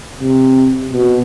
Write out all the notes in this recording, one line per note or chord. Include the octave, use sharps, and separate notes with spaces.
C3
B2